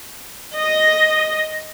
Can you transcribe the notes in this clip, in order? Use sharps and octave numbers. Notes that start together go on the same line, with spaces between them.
D#5